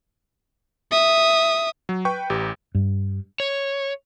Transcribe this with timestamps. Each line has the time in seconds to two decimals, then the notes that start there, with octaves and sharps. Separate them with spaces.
0.91 E5 D#6
1.89 F#3
2.05 B4 G5 C#6
2.30 A1 G4
2.75 G2
3.40 C#5